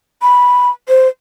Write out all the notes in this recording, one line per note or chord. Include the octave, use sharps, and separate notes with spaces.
B5
C5